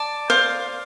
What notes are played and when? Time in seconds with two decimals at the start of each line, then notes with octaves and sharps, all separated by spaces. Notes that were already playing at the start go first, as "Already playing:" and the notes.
Already playing: D5 A5
0.30 C5 F5